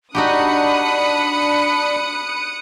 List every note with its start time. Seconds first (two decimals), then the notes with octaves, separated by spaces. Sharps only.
0.15 D4 D#4 F#4 G4 B5 D#6 F#6 C#7